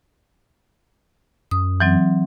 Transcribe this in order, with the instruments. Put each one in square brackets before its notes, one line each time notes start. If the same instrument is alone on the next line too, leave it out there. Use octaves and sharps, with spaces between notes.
[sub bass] F#2 [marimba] D#6
[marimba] E3 F#3 C4